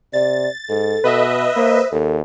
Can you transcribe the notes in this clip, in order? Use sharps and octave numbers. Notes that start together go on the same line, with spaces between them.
C3 D5 A6
G#2 A4
B2 B4 D#5 E5
A#3 C5
D#2 A4